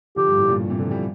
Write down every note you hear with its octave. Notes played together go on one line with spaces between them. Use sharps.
D3 F3 G4
G2
A2
G2 A#2
C3 E3
D3 F3
E3 G3